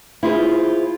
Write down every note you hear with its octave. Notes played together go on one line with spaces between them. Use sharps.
E4 F4 G#4 C5